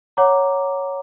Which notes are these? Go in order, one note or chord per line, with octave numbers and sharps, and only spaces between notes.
C#5 F#5 A#5 D6